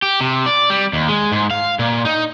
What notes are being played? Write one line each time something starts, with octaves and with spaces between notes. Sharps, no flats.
G4
C3
D5
G3
D#2
G#3
G#2
F5
A#2
D#4